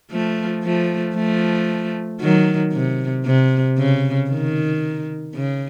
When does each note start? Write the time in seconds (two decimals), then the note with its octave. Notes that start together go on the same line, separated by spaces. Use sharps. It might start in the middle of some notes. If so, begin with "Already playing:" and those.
0.11 F3 A3
0.63 F3 A3
1.15 F3 A3
2.21 D#3 F#3
2.73 C3
3.26 C3
3.78 C#3
4.30 D#3
5.35 C#3